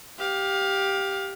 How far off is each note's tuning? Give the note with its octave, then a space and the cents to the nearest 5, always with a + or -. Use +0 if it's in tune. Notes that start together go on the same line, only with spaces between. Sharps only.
G4 +0 F5 +20